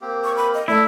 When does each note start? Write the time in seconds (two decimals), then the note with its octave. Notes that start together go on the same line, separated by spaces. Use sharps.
0.01 A#3 C4 G4 A#4
0.24 C#6
0.36 B5
0.54 D#5
0.68 A3 E4 A4 D5